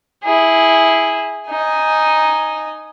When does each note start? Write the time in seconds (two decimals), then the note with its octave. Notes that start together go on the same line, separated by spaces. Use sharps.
0.23 E4 G#4
1.49 D#4 G#5